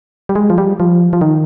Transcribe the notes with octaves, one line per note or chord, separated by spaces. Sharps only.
G3
G#3
F3
G3
F3
F3
D#3